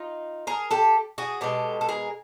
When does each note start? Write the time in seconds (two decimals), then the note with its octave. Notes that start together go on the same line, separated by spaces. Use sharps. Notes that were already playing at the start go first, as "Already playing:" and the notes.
Already playing: D#4 F4
0.47 G#4 A#4
0.71 G4 A4
1.18 F#4 G#4
1.41 B2 G#3 G4 A4
1.81 A4
1.89 G#4 A#4